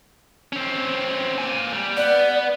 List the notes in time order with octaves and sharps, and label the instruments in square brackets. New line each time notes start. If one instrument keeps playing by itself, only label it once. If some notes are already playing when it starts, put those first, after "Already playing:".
[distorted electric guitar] C4 C#4
A#3 G#5
G3
[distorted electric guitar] B3 B4 [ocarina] D5